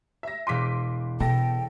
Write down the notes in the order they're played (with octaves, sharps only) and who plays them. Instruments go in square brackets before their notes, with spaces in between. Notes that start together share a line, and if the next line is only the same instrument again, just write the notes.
[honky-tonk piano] E5 A#6
[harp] E1 D#7 [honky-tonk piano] C6 D6 B6
[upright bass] B2 [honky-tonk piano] A4 A#6 [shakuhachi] G5